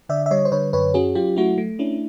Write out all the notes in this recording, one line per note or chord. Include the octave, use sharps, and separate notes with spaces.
D3 D5 E5
E5
G3 C#5 D#5
C5
D3 B4 C#5
F#2 B4 C#5
C#4 F#4 G#4
F#3 F4 G4
A3 E4 F#4
A3
C#4 D4 E4